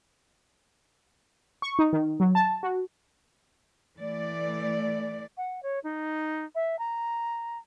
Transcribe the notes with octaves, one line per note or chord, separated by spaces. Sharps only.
C#6
D#4
D#3
F#3
A5
F#4
E3 A3 D5
F#5
C#5
D#4
E5
A#5